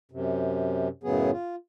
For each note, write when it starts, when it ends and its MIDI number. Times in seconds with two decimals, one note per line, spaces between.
0.11 0.88 42
0.11 0.88 48
1.03 1.31 42
1.03 1.31 45
1.03 1.31 49
1.03 1.31 54
1.03 1.31 59
1.03 1.31 68
1.32 1.55 65